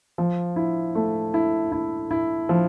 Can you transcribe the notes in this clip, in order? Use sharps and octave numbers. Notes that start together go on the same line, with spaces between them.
F3
E4
A3
E4
E4
E4
F3